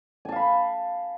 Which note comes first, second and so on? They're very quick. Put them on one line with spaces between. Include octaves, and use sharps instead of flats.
G#5 A5 F5 B5